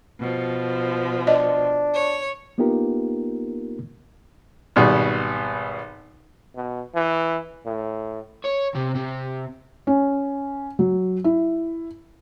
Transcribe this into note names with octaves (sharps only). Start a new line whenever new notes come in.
B2 F3
D4 D#5
C#5
A#3 B3 D#4 F4 G4 A#4
G#1 B2 G3
B2
E3
A2
C#5
C3
C3
C#4
F#3
E4